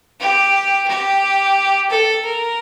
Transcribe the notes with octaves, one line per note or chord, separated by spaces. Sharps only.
G4
G4
A4
A#4